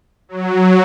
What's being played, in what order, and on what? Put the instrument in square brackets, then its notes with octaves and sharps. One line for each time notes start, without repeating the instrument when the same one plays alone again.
[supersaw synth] F#3